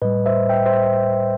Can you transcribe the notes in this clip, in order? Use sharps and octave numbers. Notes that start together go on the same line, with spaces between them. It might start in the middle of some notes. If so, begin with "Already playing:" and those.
A2 G3 B4 D#5
C5 E5
E5 G5
C5 E5